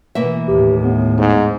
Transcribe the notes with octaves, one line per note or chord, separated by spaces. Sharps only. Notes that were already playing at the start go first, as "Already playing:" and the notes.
B2 E3 A#3 B4 E5
D#2 A2 G4
B3
G#2